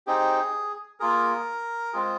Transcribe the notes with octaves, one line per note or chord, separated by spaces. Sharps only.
C4 D#4 G4 G#4
A#3 F4 G#4 A#4
G#3 C4 F4 G#4